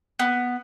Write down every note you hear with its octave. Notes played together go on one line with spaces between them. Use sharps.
B3